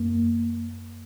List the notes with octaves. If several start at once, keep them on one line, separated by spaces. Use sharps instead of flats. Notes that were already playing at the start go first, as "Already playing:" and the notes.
Already playing: F#2 A#3